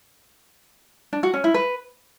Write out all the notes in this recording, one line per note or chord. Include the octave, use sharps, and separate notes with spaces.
D4
F#4
C#4
E4
B4